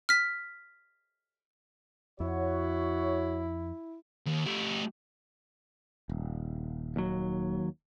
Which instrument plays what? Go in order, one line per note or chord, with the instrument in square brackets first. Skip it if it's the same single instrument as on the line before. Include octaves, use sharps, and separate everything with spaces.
[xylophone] F6 B6
[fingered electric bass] F2 [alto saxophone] E4 [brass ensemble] F#4 C#5
[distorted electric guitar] D#2
A3 G4
[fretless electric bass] D#1
[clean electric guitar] D#2 F#3